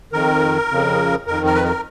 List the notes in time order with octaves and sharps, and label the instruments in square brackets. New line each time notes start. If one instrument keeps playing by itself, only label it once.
[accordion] F2 D#3 A#4
F2 C#3
F2 D#3 A#4
A#4
B4
A#4